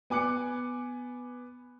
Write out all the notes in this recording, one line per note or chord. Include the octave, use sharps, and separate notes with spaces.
B3 G#5 D6 F#6 C#7